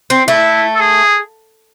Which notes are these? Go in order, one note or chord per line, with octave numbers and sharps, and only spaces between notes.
C4
A3 E4
A4
G#4